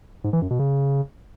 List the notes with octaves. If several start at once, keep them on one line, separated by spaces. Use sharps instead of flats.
G#2
E3
F#2
B2
C#3